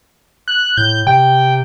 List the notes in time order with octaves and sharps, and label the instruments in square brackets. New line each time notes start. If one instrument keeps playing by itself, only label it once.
[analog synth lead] F#6
[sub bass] A2 [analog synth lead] G6
[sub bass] C3 [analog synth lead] G5